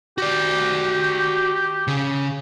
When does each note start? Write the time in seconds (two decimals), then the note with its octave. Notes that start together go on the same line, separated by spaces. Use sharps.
0.18 F#4 G4 D5
1.88 C#3